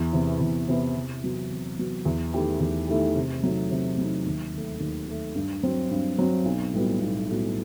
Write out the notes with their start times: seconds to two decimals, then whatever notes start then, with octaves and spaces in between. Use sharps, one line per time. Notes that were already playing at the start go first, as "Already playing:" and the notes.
Already playing: E2
0.13 C3 E3 B3 E4
0.41 E2
0.68 C3 E3 B3 E4
0.96 C3
1.23 F#3 B3 F#4
1.51 C3
1.79 F#3 B3 F#4
2.05 E2
2.34 D#3 A3 E4 G4
2.60 E2
2.88 D#3 A3 E4 G4
3.16 C3
3.43 F#3 A3 D#4
3.71 C3
3.98 F#3 A3 D#4
4.26 D#2
4.53 D#3 A3
4.80 D#2
5.08 D#3 A3
5.35 G2
5.63 F#3 C4
5.91 G2
6.18 F#3 C4
6.45 B1
6.73 A2 G3 B3 F#4
7.01 B1
7.29 A2 G3 B3 F#4